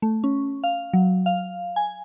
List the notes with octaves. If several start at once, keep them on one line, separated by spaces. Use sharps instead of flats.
A3
C#4
F5
F#3
F5
G#5